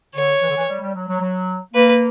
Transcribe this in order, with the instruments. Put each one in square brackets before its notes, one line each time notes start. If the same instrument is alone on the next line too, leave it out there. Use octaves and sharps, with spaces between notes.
[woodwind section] D3 [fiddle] C#5
[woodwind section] E3
D3
E3
G3
G3
F#3
F#3
F#3
[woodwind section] A#3 [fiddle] B4